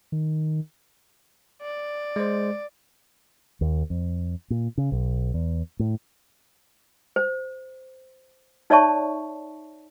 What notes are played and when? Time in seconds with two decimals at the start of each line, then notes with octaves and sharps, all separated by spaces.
0.12 D#3
1.62 D5
2.16 G#3 C5
3.61 D#2
3.90 F2
4.50 A#2
4.78 C#3
4.92 B1
5.34 E2
5.79 A2
7.16 C5
8.70 D#4 C#5 D5 E5 A5 C#6